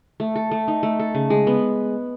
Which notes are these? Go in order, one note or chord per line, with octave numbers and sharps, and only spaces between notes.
A3
A4
A3
D#4
A3
A4
C#3
G#3
B3